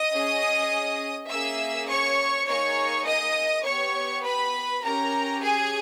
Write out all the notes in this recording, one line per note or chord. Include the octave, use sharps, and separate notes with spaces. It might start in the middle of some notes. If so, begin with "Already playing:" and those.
Already playing: D#5 D#6
C#4 G#4
A#3 C#4 G#4 E5 E6
C#5 C#6
A#3 D#4 G#4 C#5 C#6
D#5 D#6
B3 G4 C#5 C#6
B4 B5
C#4 G4 A#4 A#5
G#4 G#5